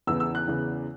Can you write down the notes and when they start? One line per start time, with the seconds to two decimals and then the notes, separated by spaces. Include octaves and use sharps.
0.07 E2 C#3 E3 E6
0.20 E6
0.35 F#6
0.47 E2 C#3 E3